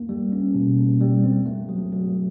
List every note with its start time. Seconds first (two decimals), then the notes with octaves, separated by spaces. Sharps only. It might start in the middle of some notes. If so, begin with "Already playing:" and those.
Already playing: A#3
0.09 G3
0.32 C#4
0.55 B2
0.78 A#3
1.01 G3
1.24 C4
1.46 A3
1.69 F#3
1.92 F#3